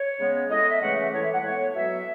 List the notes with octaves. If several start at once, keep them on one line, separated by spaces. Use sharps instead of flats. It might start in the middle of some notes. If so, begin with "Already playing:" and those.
Already playing: C#5
C#3 G#3 B3
A2 G#3 B3 D#5
E5
C#3 E3 A3 F#5
E5
A2 E3 G#3 C#5
E5
F#5
A2 G#3 B3 C#5
B2 F#3 B3 E5